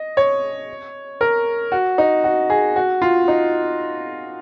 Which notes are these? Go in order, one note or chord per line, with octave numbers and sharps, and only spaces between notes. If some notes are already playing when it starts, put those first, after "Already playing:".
Already playing: D#5
C#5
A#4
F#4
D#4
F#4
G#4
F#4
F4
D#4